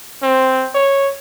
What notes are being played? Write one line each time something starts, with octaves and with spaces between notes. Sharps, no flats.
C4
C#5